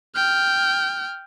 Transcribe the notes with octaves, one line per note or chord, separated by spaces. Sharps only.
G5 F6